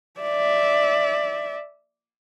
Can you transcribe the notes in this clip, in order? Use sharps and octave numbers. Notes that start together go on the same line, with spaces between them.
D5 E5